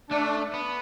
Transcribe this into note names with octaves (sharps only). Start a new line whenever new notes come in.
A3 D4
B3